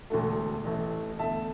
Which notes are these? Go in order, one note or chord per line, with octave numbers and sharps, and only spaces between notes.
E1 D2 D3 A3
A1 A2 E3 A3
E2 D3 A3 E5 A5